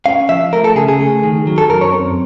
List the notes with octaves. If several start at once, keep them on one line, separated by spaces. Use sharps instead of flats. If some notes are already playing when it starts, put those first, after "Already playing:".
C#4 F5
F3 E5
A3 A#4
A4
C#3 G#4
G#4
A3
D#3
F#3
A4
F#2 A#4
C#5
C4